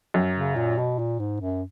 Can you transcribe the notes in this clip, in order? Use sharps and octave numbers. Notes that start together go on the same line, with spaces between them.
F#2
C#3
A#2
B2
A#2
G#2
F#2